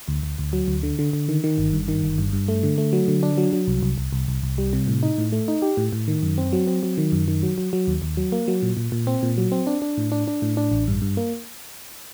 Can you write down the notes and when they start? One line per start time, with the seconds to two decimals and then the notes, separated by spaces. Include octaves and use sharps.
0.08 D2
0.23 D2
0.38 D2
0.53 F#3
0.68 D2
0.83 D3
0.99 D3
1.13 D3
1.29 D#3
1.44 D#3
1.58 G1
1.73 G2
1.88 D#3
2.03 G1
2.18 G2
2.33 G2
2.48 A3
2.63 D3
2.78 A3
2.93 F#3
3.08 D3
3.23 D4
3.38 F#3
3.53 F#3
3.67 C2
3.83 C2
3.98 C2
4.13 C2
4.28 C2
4.43 C2
4.58 G3
4.73 C3
4.88 A2
5.03 D#4
5.18 A2
5.33 A3
5.48 D#4
5.62 G4
5.77 A2
5.92 A2
6.08 D#3
6.22 F#2
6.38 C4
6.53 F#3
6.67 C4
6.83 F#3
6.98 D#3
7.12 F#2
7.28 D#3
7.43 F#3
7.58 F#3
7.73 F#3
7.88 D#2
8.02 D#2
8.17 F#3
8.32 A#3
8.48 F#3
8.62 A#2
8.77 A#2
8.92 A#2
9.07 C4
9.23 A#2
9.38 F#3
9.52 C4
9.67 D4
9.82 D4
9.97 A2
10.12 D4
10.28 D4
10.42 A2
10.57 D4
10.72 A1
10.88 G2
11.02 G2
11.17 A#3